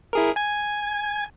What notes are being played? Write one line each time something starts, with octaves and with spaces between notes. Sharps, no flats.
E4 G#4 A#4
G#5 G#6